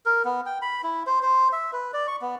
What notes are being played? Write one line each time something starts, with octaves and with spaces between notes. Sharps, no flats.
A#4
B3
G5
B5
E4
C5
C5
E5
B4
D5
C#6
B3